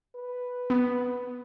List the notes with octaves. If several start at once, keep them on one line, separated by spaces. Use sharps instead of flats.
B4
B3